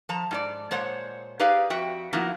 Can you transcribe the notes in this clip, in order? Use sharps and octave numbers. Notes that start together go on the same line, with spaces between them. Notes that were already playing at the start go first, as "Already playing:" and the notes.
F3 A5 A#5
G#2 G4 D5
A#2 G#3 C5 C#5 F#5
D#4 G4 G#4 B4 D5 F5
F2 F#4 E5 G5
F3 A#3 B3 D#4 E4 F#4